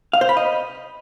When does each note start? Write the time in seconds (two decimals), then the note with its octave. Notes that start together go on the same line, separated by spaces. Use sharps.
0.13 F5
0.21 C5
0.29 B5
0.37 D#5